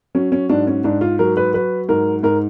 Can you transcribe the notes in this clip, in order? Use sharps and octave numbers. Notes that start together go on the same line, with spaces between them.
F#3 C#4
C#4
G#2 D4
C#4
G#2 D4
F4
F#3 A#4
B4
F#3 B4
G#2 A#4
G#2 A#4